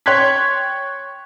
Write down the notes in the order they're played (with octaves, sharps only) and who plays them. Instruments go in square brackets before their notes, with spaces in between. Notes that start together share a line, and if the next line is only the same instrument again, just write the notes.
[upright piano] C#5 G5 C6 F#6 G#6 B6